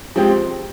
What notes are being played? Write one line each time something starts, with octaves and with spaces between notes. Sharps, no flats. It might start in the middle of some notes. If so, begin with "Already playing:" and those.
F3 G#3 C4 G4